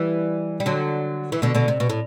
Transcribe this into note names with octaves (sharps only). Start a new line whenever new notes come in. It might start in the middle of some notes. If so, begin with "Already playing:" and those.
Already playing: E3 G3
G3
D3 F#3
E3
B2 D3
B2 D3
C3
B2
A2